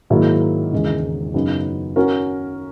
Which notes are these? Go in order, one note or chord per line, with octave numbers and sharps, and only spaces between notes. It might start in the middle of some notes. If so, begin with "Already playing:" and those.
G#2 D#3 F#3 A#3 E4
E1 D#2 C#3 G#3
F#2 C#3 F#3 B3 D#4
C#4 F#4 A#4